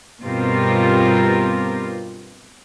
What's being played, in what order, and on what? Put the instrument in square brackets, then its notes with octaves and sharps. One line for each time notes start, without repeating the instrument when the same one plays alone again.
[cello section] G2 B2 C4 F4 G4 A#4